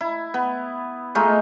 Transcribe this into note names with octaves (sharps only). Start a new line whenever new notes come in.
E4
B3
G#3 A3 D#4 F4